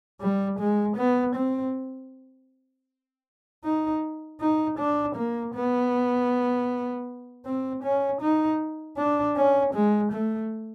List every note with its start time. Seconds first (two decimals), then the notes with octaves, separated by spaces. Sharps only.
0.21 G3
0.59 G#3
0.97 B3
1.35 C4
3.64 D#4
4.40 D#4
4.79 D4
5.16 A#3
5.54 B3
7.45 C4
7.83 C#4
8.21 D#4
8.97 D4
9.36 C#4
9.74 G#3
10.12 A3